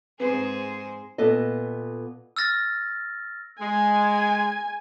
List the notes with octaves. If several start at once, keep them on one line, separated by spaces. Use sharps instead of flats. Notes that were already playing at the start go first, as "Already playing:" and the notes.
G#2 C4 G#4 B4 C5
A#2 B3 A4 D#5
E6 F6 A6 A#6
G#3 G#5